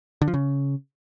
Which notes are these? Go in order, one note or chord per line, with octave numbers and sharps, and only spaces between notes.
D3
F3
C#3